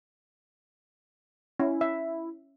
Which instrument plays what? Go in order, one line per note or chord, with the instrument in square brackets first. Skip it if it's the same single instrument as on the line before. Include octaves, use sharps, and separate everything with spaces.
[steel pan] C#4 [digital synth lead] E4
[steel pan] E5